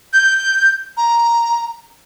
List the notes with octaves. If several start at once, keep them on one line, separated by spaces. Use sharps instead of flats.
G6
A#5